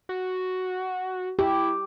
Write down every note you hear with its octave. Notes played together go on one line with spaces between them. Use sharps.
F#4
E4 G4